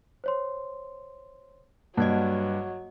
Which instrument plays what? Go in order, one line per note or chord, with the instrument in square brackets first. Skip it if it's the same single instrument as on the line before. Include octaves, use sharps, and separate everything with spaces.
[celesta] C5 C#5 C6
[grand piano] G2 [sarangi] F#3 [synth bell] A#3 D#5 [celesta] F#5 G#6